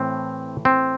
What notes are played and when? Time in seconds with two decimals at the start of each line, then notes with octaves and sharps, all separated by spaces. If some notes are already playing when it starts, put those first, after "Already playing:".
Already playing: A2 E3 A3 C4
0.65 C4